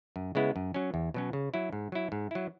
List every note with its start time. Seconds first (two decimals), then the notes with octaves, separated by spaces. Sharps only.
0.16 F#2
0.35 C#3 G#3 B3 E4
0.56 F#2
0.74 F#3 C#4
0.94 E2
1.14 B2 F#3 C#4
1.33 C#3
1.54 F#3 E4
1.72 G#2
1.92 F#3 E4
2.12 G#2
2.31 F#3 E4